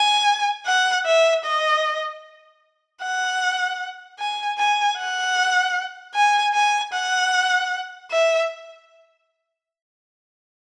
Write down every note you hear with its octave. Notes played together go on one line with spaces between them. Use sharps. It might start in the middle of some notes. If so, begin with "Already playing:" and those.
Already playing: G#5
F#5
E5
D#5
F#5
G#5
G#5
F#5
G#5
G#5
F#5
E5